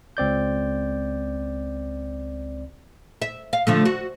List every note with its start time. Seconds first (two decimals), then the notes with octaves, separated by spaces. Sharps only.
0.17 C#2 C4 D5 G6
3.22 E5
3.53 F5
3.67 D3 F3 A3
3.85 F#4